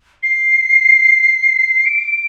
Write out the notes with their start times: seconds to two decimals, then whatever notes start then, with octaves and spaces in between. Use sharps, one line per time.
0.23 C7
1.86 D7